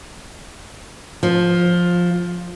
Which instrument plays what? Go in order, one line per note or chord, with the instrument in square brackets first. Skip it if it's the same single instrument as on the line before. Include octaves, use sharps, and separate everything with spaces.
[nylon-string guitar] F3